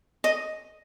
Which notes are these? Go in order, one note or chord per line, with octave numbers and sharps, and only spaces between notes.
D#5